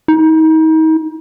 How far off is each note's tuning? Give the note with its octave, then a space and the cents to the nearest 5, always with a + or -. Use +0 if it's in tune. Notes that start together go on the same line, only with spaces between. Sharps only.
D#4 +35